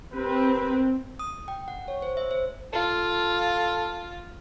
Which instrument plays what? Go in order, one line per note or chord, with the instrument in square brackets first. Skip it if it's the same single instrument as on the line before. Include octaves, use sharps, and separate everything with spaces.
[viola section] C4 [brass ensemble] G4 A#4 B4
[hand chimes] D#6
G5
F#5
C#5
C5
E5
C5
[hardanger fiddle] F4 [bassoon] A4